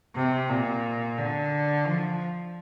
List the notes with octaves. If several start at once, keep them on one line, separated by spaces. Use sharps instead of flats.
C3
A#2
D3
F3